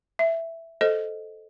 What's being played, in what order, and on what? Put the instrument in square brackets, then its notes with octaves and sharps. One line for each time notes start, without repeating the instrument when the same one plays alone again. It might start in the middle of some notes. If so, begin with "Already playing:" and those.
[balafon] E5
A4 C5 D#5